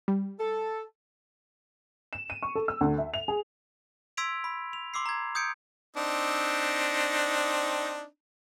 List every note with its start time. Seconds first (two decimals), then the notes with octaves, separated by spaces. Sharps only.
0.08 G3
0.39 A4
2.13 E7
2.30 D#7
2.43 C#6
2.55 A4
2.68 E6
2.81 D2
2.98 E5
3.14 F7
3.28 G#4
4.17 C6 E6 G#6 B6 D7 F7
4.44 B5
4.73 F7
4.94 C6 D6 E6 C7
5.06 A#5 G#6
5.35 D#6 G6 G#6 C#7 D7
5.96 C4 D4 D#4